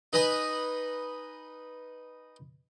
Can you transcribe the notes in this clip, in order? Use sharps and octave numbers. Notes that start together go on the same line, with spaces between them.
D#4 B4 D#5 G#5 B5